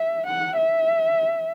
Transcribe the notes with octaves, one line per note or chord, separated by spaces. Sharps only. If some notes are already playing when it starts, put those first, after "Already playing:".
Already playing: E5
F#5
E5